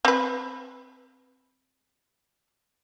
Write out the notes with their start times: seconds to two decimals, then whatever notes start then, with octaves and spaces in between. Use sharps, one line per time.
0.05 C4 B4